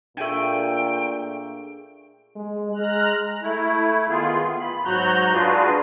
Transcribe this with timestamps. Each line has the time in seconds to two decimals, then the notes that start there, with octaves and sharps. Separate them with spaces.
0.17 A#2 A3 D4 G#4 G5 G#5
2.36 G#3
2.72 G#3 A#5 F6 F#6
3.42 A3 E4
4.09 D#3 B3 F4 G#4
4.60 B5
4.85 G#2 F#3 F#4 A#5 F#6 G6
5.33 D4 F4 F#4 G#4 B4